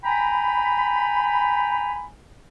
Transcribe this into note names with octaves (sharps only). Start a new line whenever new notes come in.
G5 G#5 A#5 B5